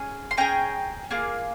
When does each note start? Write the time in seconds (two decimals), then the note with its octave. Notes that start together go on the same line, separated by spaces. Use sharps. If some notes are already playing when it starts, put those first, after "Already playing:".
Already playing: C#4 G#4
0.31 C6
0.37 C#4 G#4 G5 A#5
1.11 A#3 F4 G#4